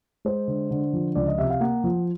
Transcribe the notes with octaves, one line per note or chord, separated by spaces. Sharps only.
G#3 C5
D3
D3
F3
C#2 D5
D#5
C3 E5
F5
A#3 F#5
F3